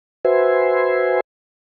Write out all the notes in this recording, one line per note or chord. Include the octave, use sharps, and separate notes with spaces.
F#4 B4 C5 E5 G#5 C6